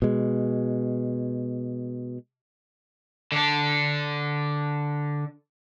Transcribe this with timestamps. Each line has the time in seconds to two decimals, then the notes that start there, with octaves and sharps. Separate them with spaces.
0.02 B2 G#3
3.32 D3 D4